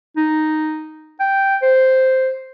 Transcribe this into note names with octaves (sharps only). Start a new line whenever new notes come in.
D#4
G5
C5